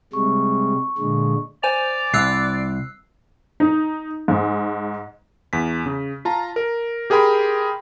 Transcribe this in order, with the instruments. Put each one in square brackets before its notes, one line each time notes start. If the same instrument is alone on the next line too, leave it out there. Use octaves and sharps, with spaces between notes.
[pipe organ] C3 G3 G#3 [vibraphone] C#6
[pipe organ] A#2 D3 G#3
[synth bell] C5 G#5 F7 [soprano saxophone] D5
[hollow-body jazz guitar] C2 [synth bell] E6 F#6 C7
[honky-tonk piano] D#4
G#2
[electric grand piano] E2 B6
C#3
F4 A5 A#5
A#4
G4 G#4 A#4 G5 B5 C6